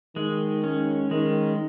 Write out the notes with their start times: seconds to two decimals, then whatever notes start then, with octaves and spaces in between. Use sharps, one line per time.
0.16 D#3 G#3
0.64 C#4
1.11 D#3 G#3